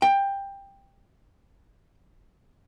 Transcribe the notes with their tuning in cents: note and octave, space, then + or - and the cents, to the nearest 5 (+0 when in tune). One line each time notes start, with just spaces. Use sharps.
G5 +15